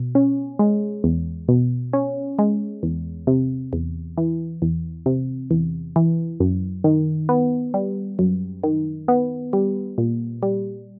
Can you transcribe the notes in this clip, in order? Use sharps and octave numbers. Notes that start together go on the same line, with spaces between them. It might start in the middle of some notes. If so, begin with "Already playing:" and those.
Already playing: B2
C#4
G#3
E2
B2
C#4
G#3
E2
C3
E2
E3
E2
C3
E2
E3
F#2
D#3
B3
G3
F#2
D#3
B3
G3
A#2
G3